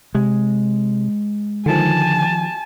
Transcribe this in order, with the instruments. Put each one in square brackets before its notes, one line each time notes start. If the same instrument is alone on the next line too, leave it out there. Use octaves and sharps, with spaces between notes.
[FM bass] C3 [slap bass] G#3
[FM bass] D3 [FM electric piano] D#3 F3 [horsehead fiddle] G#5 A5